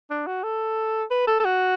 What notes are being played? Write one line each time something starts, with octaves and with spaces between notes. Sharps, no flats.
D4
F#4
A4
B4
A4
A4
F#4